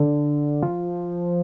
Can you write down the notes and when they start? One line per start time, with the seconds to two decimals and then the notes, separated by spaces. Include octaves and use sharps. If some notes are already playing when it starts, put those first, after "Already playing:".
Already playing: D3
0.63 F3